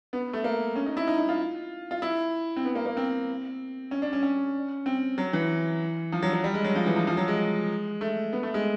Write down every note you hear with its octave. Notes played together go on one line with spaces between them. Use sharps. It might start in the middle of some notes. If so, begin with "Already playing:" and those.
B3
A3
A#3
C#4
D#4
E4
D#4
D#4
F4
F4
E4
C4
B3
A#3
A#3
C4
C#4
D4
C#4
C#4
C4
F#3
E3
F3
F#3
F#3
G3
G#3
F#3
F3
E3
F3
F3
F#3
G#3
A3
B3
A3
G#3